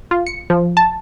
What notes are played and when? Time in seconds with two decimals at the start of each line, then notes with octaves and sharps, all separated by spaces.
0.11 F4
0.26 C#7
0.50 F3
0.77 A5